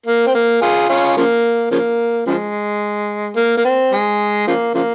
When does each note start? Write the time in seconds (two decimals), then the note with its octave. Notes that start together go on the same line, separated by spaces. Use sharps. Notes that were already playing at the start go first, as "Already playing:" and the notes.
0.06 A#3
0.27 C4
0.34 A#3
0.62 F4 G#4
0.89 C#4 F4
1.17 C#3 F3 A#3
1.71 C#3 F3 A#3
2.27 C#3 F3 G#3
3.37 A#3
3.57 A#3
3.65 C4
3.92 G#3
4.48 C#3 F3 A#3
4.74 C#3 F3 A#3